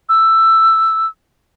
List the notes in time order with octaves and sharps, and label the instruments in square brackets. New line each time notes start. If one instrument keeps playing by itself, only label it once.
[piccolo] E6